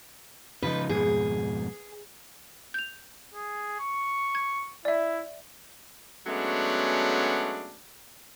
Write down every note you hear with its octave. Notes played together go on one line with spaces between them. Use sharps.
C#3 F3 D#4 B4
F2 G#2 B2 G#4
G6 F7
G#4
C#6
G#6
E4 D5 E5
F#3 G#3 A3 B3 C#4 D4